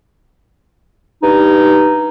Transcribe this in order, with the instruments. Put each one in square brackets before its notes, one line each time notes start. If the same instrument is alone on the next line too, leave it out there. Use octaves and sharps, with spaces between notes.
[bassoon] G2 [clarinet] D#4